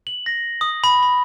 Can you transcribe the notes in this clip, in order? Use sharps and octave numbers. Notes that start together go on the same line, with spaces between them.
F#7
A#6
D#6
B5
B5